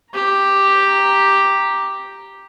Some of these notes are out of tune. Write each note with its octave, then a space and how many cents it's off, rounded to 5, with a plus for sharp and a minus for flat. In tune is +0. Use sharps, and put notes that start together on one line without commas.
G4 +0 A#5 +0